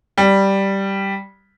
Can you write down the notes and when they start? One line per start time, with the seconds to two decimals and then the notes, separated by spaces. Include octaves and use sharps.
0.18 G3